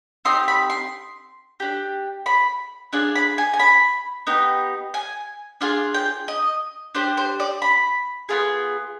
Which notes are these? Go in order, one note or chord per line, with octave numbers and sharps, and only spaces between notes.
C4 D#4 G4 C6
B5
C6
D4 G4
B5
D4 F4 G#4
B5
G#5
G#5
B5
B3 D#4 G4
G#5
D4 F4 G#4 F5
G5
D#5
D4 G4 C5
C5
D5
B5
B3 F4 G#4